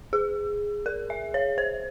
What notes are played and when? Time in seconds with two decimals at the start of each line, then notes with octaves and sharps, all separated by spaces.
0.13 G#4
0.86 A#4
1.10 E5
1.34 C#5
1.58 C5